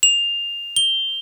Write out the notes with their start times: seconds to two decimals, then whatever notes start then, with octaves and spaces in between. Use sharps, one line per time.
0.03 F7
0.76 G7